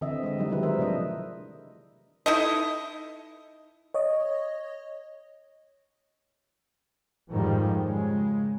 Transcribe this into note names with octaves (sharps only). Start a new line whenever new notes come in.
D3 E3 C4 D#5 E5
G#3 D#5
E3 F#3 G3 D#4
D#3 G3 G#3 E4 B4
F3 E4 A#4 C5 E5
C3 A3 D4 D#5
D#4 E4 A4 D#5
C#5 D#5
F2 G#2 D#3 F3 G3
C#3 G#3